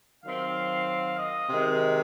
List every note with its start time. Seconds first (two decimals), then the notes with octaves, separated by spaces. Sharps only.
0.24 D#3 F#3 C4 F5
1.18 D#5
1.49 C3 D#3 G#3